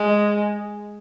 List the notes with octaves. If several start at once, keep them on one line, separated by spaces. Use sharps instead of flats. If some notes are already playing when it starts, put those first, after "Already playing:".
Already playing: G#3